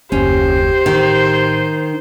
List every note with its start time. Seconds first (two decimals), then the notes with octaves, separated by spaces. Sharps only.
0.12 F#1 D#2 C#4 G4 C5
0.86 A1 D#3 D#4